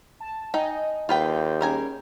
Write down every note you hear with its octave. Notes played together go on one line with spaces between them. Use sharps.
A5
D#4 D#5 G5 G#5
D#2 F4 B4 G5 C6 G6
G3 C#4 G#4 A#4 G#5